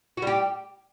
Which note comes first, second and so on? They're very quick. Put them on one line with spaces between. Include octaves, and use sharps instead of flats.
F#4 G3 G4